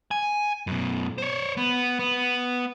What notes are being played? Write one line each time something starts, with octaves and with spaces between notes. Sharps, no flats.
G#5
F#2 B2
C5 C#5
B3
B3